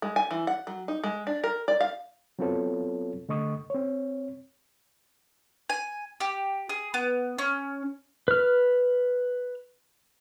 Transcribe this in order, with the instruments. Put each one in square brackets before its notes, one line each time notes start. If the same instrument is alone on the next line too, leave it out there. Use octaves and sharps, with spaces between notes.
[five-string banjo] G#3
G#5
E3
F#5
F#3
D#4
G#3
D4
A#4
D5
F5
[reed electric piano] F#3 B3 C4 F4 A4 C#5
D3 A3 D#5 C#6 D#6
C4 C#5
[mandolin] G#5
G4
G#4
B3
C#4
[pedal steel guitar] B4 F6